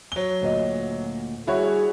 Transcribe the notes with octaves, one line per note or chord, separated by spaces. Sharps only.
F#3 G7
D2 A#2 D#5
G3 E4 F#4 G#4 C#5